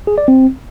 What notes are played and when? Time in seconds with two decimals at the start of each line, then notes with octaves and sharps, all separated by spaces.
0.07 G#4
0.18 D5
0.28 C4